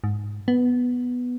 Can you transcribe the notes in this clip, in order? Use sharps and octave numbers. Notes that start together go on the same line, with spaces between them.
G#2
B3